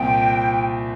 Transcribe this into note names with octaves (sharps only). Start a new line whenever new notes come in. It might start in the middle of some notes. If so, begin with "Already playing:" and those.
Already playing: C2 A#2 F3 C4 G5